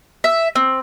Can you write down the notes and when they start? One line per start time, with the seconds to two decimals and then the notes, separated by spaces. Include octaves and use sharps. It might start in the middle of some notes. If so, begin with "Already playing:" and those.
0.24 E5
0.55 C4